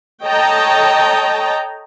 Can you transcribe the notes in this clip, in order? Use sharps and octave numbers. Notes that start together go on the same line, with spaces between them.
A4 C#5 D#5 G5 A5 A#5